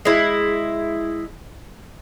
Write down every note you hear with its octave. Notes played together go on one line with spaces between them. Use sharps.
G#3 E4